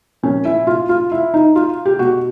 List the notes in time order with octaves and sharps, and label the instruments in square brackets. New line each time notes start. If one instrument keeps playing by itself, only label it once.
[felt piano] A#2 F3 C#4
E4
F4
F4
E4
D#4
F4
G4
B2 F#4